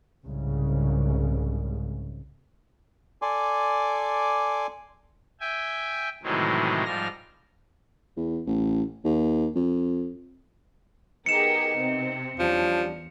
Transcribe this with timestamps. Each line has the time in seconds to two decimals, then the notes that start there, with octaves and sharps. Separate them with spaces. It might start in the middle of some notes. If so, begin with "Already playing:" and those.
0.25 C2 G#2 C#3
3.22 A4 D5 G#5 C6 D6
5.40 E5 G5 G#5
6.23 A2 C3 D#3 E3 F#3 G#3
6.85 G#2 F3 G3 F6 A#6
8.17 E2
8.46 A1
9.04 D#2
9.56 F2
11.26 B3 D#4 G4 G#4 A#4 C#7 E7
11.77 C3 C4
12.39 E2 F3 G3 C#4 D4